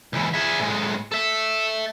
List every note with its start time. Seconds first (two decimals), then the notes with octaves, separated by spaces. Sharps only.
0.13 C#2 E3
0.34 G#4 E5
0.60 A2 G#3
1.12 A4 E5